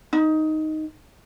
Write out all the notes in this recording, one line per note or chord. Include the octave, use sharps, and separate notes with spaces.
D#4